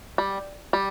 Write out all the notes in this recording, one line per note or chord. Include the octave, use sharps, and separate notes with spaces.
G3
G3